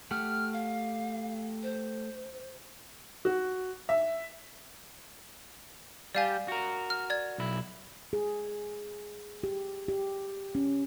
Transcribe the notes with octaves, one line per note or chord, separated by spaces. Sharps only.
A3 G4 F#5 F6
F5
C5
F#4
E5
G3 G4 D5 F5 G#5
F#4 A#4
F6
D5 G#6
B1 E4
G#4
G4
G4
C#4